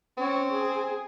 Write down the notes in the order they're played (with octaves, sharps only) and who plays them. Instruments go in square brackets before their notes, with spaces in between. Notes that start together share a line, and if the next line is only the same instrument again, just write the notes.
[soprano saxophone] C4 [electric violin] C#4 C#5
[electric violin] G#4